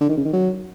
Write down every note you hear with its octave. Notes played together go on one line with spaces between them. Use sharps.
D3
D#3
C#3
D#3
F#3